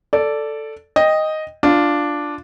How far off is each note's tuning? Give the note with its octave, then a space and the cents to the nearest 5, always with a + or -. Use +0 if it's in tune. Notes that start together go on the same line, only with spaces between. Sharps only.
A4 +5 D5 -5
D#5 +0 G5 +15
D4 +0 F4 +0